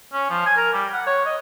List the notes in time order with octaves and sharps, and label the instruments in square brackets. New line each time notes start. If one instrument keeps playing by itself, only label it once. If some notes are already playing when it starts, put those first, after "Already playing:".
[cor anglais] C#4
F3
G#5
A#4
G3
F#5
C#5
D#5